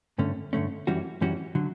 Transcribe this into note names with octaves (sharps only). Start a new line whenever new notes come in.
G2 D3 A3 C#4
G2 D3 A3 C#4
F#2 E3 G3 C#4 F#4
F#2 E3 G3 C#4 F#4
D3 F#3